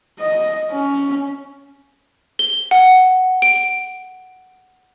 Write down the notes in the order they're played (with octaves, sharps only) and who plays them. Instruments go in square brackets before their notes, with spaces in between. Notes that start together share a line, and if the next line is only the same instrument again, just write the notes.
[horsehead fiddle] D#5
C#4
[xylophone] G7
F#5
D7